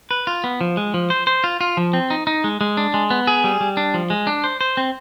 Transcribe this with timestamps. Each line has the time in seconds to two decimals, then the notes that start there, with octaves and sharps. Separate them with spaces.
0.11 B4
0.27 F4
0.44 B3
0.61 F3
0.77 G#3
0.94 F3
1.10 C5
1.27 C5
1.44 F4
1.61 F4
1.77 F3
1.93 C4
2.10 D#4
2.27 D#4
2.44 G#3
2.61 G#3
2.77 D4
2.94 G#3
3.10 B3
3.27 G#4
3.44 G3
3.61 G3
3.77 D4
3.94 F3
4.10 G#3
4.27 D4
4.44 C5
4.61 C5
4.77 C4